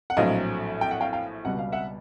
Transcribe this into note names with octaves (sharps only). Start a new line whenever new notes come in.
F#5
A#1 A2 F#3 A3 C4 D#5 F5
G5
F#5
F5 G5
F5 G5
C#2 B2 G3 F#5
F5
E5 F#5